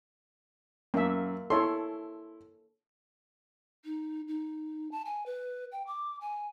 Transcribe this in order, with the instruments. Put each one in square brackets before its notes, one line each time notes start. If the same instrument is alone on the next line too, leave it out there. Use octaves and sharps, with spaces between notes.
[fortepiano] F#2 [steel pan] A#3 E5
[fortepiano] E4 C6 [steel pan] A4 C#5
[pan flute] D#4
D#4
A5
G#5
B4
G5
D6
G#5